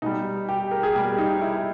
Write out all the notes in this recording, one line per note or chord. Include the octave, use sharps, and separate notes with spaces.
B2 G3 D#4
G4
A#4
G#4
B2 G3 G4
D#4
E4